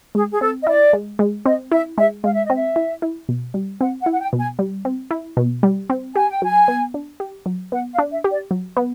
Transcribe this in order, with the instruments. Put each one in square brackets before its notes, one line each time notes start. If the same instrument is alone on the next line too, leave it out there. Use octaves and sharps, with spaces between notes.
[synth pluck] G#3 [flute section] G#4
[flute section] G#4
[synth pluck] C4 [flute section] A4
[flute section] D#5
[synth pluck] E4 [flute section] D5
[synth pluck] G#3
G#3
[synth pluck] C4 [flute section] D#5
[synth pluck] E4 [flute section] E5
[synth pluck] G#3 [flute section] E5
[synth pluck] G#3 [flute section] F5
[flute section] E5
D#5
[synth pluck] C4 [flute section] E5
[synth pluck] E4
E4
B2
G3
[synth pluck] C4 [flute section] F#5
[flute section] F#5
[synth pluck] E4
[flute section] F#5
G5
[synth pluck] B2
[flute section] G#5
[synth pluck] G3
C4
E4
B2
G3
C4
[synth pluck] G4 [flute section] G#5
[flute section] G5
[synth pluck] F#3 [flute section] G#5
[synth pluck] B3
D4
G4
F#3
[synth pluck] B3 [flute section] F#5
[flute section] F5
[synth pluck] D4
[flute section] E5
[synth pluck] G4
[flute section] D5
[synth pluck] F#3
B3